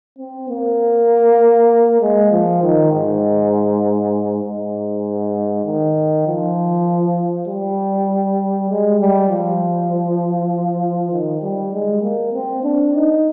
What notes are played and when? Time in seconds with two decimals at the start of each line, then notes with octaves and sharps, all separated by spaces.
0.19 C4
0.49 A#3
2.01 G#3
2.32 F3
2.62 D#3
2.92 G#2
4.44 G#2
5.65 D#3
6.27 F3
7.48 G3
8.70 G#3
8.99 G3
9.30 F3
11.12 D#3
11.42 G3
11.72 G#3
12.02 A#3
12.33 C4
12.63 D4
12.94 D#4